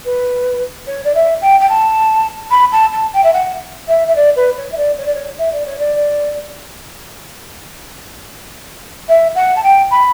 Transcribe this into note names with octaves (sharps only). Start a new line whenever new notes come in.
B4
C#5
D5
E5
G5
G5
A5
B5
A5
A5
G5
E5
F#5
E5
E5
D5
B4
C#5
E5
D5
C#5
D5
C#5
E5
D5
C#5
D5
E5
F#5
A5
G5
B5